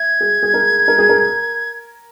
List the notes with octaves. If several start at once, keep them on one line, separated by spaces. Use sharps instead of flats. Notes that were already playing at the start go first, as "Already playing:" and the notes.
Already playing: E5 G#6
G#4
G#4
A#4
A#4
G#4
A#4